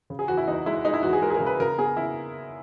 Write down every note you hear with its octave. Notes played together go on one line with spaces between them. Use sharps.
C#3
G#4
E2 F#4
E4
E2 D#4
G#3 E4
G#3 D#4
E4
E2 F#4
G#4
G#3 A#4
G#4
A#4
C#3
B4
C#3 A#4
B3 G#4
C#3 E4